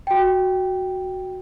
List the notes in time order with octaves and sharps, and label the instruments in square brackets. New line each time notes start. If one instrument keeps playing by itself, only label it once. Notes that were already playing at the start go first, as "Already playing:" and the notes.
[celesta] F#4 G5